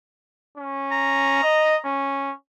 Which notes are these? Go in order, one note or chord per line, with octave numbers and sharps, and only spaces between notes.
C#4
A#5
D#5
C#4